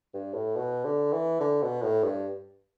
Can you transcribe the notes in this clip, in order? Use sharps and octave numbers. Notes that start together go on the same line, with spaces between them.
G2
A2
B2
D3
E3
D3
B2
A2
G2